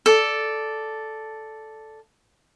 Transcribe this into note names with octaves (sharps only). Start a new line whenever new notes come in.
A4 D5